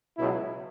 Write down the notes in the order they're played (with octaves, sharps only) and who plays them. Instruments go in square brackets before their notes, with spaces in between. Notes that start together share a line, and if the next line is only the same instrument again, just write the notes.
[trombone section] C#2 B2 F#3 E4